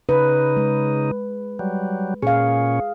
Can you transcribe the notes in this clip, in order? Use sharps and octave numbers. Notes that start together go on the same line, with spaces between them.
C#3 D#4 B4
G#3
F#3 G3
A#2 C#4 G#4 F5